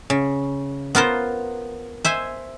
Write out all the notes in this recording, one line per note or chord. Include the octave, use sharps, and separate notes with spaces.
C#3
B3 F4 A#4 C5
C5 E5 G#5